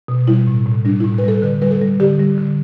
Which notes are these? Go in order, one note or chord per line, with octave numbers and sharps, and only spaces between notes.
B2
G3 E4
A2
A2
G3 D4
A2 E4
B4
G3 A4
D3 B4
G3 B4
A4
G3
D3 G4
G3
D3